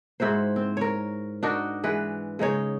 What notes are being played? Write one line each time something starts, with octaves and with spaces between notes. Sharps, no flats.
G#2 E4 F#4 C5
C4
A#4 C#5
D4 D#4 F#4 A#4
E3 G#3 B4
C#3 G#3 D#4 C#5